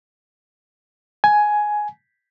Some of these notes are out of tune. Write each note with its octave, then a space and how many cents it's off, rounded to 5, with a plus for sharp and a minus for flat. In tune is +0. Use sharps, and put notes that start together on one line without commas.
G#5 +10